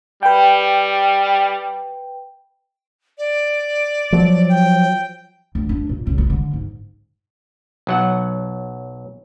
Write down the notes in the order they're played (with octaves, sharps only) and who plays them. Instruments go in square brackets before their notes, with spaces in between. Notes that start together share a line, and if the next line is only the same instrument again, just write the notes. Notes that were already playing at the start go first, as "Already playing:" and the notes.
[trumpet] G3 [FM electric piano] B4 G5
[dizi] D5
[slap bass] F3 F#3
[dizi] G5
[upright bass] D2
D4
A#2
C#2
G#3
D3
G#2
[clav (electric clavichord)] B1 F#3 F#5